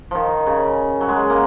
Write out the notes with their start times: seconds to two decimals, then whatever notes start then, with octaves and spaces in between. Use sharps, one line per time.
0.11 D#3 F3
0.47 C#3
1.01 F#3
1.09 G#3
1.30 A#3